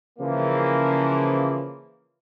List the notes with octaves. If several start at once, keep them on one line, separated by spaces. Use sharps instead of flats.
C#3 E3 F3 A#3